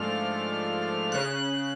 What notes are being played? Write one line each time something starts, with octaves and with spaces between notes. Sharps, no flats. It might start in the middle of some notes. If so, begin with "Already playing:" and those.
Already playing: G#2 F3 A3 D4 F6
C#3 F#6